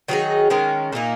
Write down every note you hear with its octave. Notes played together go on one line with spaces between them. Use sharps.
D#3 F#3 D#4 G#4
D#3 G#3 C#4 A#4
A#2 A#3 D#4